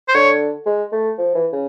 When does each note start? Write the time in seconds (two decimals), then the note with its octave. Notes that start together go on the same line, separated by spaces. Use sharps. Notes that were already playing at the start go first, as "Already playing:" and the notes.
0.08 C5
0.14 D3 C#5
0.66 G#3
0.92 A3
1.18 F3
1.35 E3
1.53 C#3